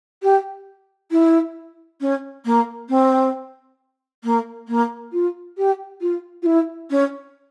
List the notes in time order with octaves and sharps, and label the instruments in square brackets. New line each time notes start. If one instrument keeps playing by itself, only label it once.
[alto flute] G4
E4
C#4
A#3
C4
A#3
A#3
F4
G4
F4
F4
E4
C#4